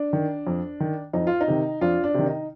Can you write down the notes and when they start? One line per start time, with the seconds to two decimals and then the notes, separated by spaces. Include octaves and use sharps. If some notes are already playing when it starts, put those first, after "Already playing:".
Already playing: D4
0.13 D#3
0.47 F2
0.80 D#3
1.13 F2 D#4
1.27 F4
1.41 D#4
1.48 C3 D#3
1.81 F2 D4 F4
2.04 D4
2.14 C3 D#3
2.26 D#4